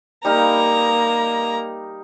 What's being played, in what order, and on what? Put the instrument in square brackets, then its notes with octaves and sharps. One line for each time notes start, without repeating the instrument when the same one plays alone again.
[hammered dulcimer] G3 D#4 F5 [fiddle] A#3 A#5